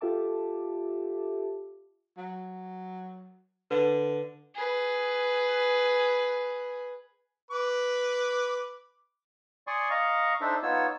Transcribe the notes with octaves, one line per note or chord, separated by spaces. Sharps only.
F4 G4 A4 E5 A5 D6
F#3
D3 B4
G#4 B4
B4 D6
D5 G#5 C6 C#6 D#6
D#5 F5 A#5 C#6
D4 D#4 A4 C5 E5
B3 D#4 F4 C#5 E6